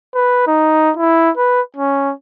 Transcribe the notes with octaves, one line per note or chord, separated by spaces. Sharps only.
B4
D#4
E4
B4
C#4